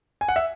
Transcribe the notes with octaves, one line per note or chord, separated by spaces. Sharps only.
G#5
F#5
E5